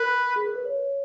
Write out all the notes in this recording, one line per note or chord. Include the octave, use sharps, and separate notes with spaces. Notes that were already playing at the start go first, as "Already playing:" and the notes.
Already playing: A#4 B4
G#4
A#4
B4
C#5